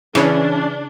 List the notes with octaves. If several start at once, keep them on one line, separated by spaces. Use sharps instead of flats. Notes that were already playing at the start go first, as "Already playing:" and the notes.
C#3 E3 C#4 D4